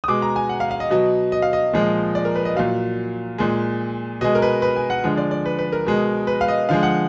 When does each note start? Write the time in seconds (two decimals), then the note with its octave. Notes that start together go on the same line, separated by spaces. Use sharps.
0.04 D#6
0.08 B2 G#3 D6
0.22 A#5
0.36 G#5
0.49 F#5
0.60 F5
0.71 F5
0.80 D#5
0.90 B2 F#3 D#5
1.32 D#5
1.42 F5
1.53 D#5
1.73 A#2 F3 G#3
2.15 D5
2.25 A#4
2.36 B4
2.45 D#5
2.56 A#2 F#3 F5
3.38 A#2 G#3
4.21 B2 G#3 D#5
4.35 A#4
4.42 B4
4.62 B4
4.76 G#5
4.90 F#5
5.04 D3 F3 G#3
5.17 D5
5.31 D5
5.46 B4
5.59 B4
5.73 A#4
5.86 B2 G#3
6.27 B4
6.41 F5
6.48 D#5
6.69 D3 F3 G#3 F5
6.83 F#5